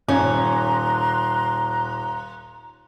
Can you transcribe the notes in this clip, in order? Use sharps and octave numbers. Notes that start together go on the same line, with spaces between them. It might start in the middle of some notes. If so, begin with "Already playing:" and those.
D#1 C#4 A#5 C6 F#6